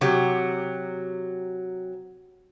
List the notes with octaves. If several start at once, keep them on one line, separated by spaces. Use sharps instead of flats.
C3 F#3 F#4 G4